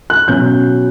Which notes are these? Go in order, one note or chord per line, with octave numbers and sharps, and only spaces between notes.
F#6
B2 F#3 C#4 G6